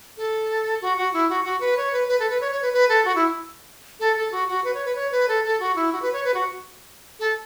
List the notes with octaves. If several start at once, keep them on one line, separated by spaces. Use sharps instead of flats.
A4
F#4
F#4
E4
F#4
F#4
B4
C#5
B4
B4
A4
B4
C#5
C#5
B4
B4
A4
F#4
E4
A4
A4
F#4
F#4
B4
C#5
B4
C#5
B4
A4
A4
F#4
E4
F#4
B4
C#5
B4
F#4
A4